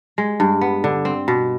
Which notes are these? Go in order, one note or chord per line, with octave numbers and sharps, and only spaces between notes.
G#3
G2
B3
D3
C4
B2